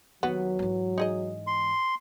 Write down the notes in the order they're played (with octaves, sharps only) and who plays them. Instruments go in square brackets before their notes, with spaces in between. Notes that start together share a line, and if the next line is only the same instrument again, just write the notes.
[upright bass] D#2 [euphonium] F#3 [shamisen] B3 F#4
[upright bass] G#2 E3
[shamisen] D#4 G#4 D#5
[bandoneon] C6